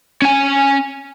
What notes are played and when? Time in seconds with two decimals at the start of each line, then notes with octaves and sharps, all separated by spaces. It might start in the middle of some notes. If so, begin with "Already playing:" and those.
0.22 C#4 G#5